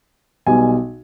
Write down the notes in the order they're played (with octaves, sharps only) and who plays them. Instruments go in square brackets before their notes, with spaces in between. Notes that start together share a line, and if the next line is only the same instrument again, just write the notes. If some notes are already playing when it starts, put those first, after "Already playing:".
[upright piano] B1 B2 G3 G#5